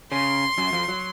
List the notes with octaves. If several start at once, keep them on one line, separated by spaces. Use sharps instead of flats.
C#3 C#4 C6
F#2 F#3
F2 F3
F#3